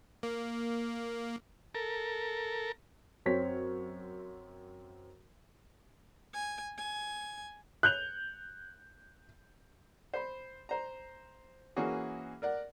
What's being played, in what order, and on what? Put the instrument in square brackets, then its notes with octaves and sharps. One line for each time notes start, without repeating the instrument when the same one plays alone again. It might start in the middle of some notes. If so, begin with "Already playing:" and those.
[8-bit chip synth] A#3
[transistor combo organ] A4 A#4
[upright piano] F#2 C4 C#5 B6
[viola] G#5
G#5
[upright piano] F#6 G6 F7
[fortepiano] C5 B5
C5 A#5
E3 A#3 C#4 F#4 G#4
A#4 D5 F#5